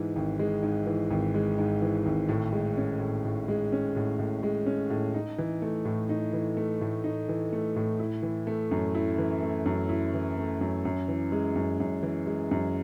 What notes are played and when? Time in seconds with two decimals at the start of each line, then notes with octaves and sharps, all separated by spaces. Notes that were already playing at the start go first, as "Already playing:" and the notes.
Already playing: G#2 E3 G#3
0.16 G#1
0.39 G#3
0.63 G#2
0.87 E3
1.11 G#1
1.34 G#3
1.58 G#2
1.82 E3
2.06 G#1
2.29 A2
2.52 G#3
2.77 C#4
3.00 A2
3.25 A2
3.48 G#3
3.72 C#4
3.96 A2
4.19 A2
4.43 G#3
4.66 C#4
4.90 A2
5.14 D#4
5.38 E3
5.62 A3
5.85 A2
6.09 D#4
6.33 E3
6.57 A3
6.81 A2
7.04 D#4
7.29 E3
7.52 A3
7.76 A2
7.99 E4
8.23 E3
8.47 A3
8.71 F#2
8.95 E4
9.18 E3
9.42 A3
9.66 F#2
9.89 E4
10.14 E3
10.38 A3
10.61 F#2
10.85 F#2
11.08 E3
11.32 G#3
11.56 F#2
11.80 F#2
12.03 E3
12.27 G#3
12.51 F#2